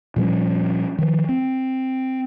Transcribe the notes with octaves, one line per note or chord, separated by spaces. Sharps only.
A#2 F3 G3 C#4
D#3 F3
C4